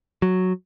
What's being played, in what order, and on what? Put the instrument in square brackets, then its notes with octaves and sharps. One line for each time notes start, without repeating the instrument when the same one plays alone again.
[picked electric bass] F#3